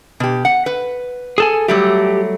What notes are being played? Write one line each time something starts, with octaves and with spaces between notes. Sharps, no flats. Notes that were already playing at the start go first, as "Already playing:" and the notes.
B2 G4
F#5
B4
G#4 A4 G#5
F#3 G3 A3 G4